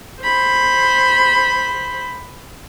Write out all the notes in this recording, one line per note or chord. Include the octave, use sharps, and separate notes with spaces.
C5 B5